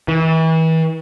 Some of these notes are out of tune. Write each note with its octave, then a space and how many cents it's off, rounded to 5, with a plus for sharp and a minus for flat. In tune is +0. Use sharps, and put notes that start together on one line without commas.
E3 -35